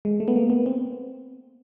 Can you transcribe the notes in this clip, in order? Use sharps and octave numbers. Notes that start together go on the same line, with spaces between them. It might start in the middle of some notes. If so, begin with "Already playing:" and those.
G#3
A3
B3
A#3
B3
C4